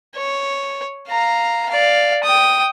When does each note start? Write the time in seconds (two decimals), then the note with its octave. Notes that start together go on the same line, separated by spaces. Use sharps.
0.16 C#5
1.08 F5 A#5
1.69 D5 F5
2.24 G5 D#6